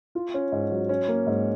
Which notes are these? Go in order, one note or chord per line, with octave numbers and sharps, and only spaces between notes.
F4
C#4
G#2
F#3
C#4
A#3
G#2